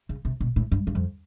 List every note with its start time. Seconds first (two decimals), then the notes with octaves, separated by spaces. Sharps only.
0.09 C#3
0.25 C3
0.40 B2
0.56 A2
0.72 G2
0.87 G2
0.95 F2